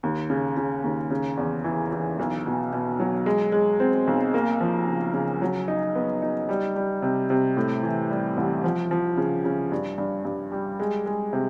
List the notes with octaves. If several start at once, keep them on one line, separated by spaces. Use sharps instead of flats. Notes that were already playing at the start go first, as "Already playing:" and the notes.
D#2
C#3
C#3
D#2
C#3
E2
E3
E3
B1
B2
B2
F#3
G#3
G#3
C4
B1
A#3
F3
C#3
C#3
F#3
D#4
B3
D#4
G3
G3
C3
C3
A2
E3
G3
A1
F3
F3
C#3
C#3
G2
G2
G2
G3
G#3
G#3
C3